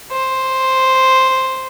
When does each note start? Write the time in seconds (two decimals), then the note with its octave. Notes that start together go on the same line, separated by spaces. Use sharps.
0.12 C5